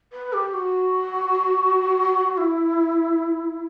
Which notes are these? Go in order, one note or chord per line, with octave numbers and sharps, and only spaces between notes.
B4
G4
F#4
E4